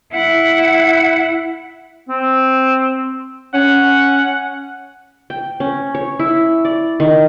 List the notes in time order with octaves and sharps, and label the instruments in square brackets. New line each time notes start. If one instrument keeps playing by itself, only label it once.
[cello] E4 F#5
[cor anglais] C4
[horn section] C#4 [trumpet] F#5
[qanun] G5
C#4
C#5
E4
D5
D#3